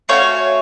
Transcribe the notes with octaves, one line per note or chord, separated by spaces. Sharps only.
A3 C#4 F#4 C#5 F5